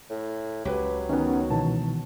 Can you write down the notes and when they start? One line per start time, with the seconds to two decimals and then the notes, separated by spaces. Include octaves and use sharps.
0.10 A2
0.65 C#2 F#3 G4 B4
1.09 D#3 B3 C#4
1.50 B2 D#3 E3 A5